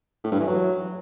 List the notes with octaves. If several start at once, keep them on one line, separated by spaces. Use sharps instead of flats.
A2
G2
E3
F#3